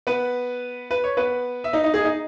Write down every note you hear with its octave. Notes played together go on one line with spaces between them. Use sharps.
B3 B4
B4
C#5
B3 B4
E5
D#4 D#5
D#4 D#5
G#4
D#4 D#5